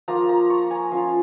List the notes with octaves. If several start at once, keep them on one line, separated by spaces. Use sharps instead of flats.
F3 A#3 F4 A#5
A#5
C#6
G#5
F3 C#4 F4 F5